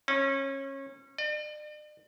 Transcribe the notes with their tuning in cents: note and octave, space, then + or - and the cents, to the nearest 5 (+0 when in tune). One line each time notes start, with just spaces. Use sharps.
C#4 -25
D5 +45